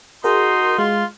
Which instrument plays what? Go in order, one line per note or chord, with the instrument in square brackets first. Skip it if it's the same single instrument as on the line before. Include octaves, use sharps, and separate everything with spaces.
[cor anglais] D#4 [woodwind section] F#4 C6 [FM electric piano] G#4 A#4
[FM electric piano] G#3 [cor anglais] F4